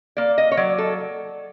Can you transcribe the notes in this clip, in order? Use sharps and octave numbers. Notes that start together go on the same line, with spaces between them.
A#3 D5
D#5
C#5
F#3 D5
A4